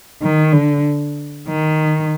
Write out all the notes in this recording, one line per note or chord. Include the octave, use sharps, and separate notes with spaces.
D#3
D3
D#3